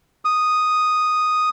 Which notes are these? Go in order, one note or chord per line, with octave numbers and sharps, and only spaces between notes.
D#6